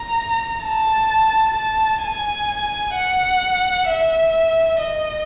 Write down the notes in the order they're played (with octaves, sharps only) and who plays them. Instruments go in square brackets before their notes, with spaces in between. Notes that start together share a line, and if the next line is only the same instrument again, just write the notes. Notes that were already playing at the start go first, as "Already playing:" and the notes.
Already playing: [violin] A#5
A5
A5
G#5
F#5
E5
D#5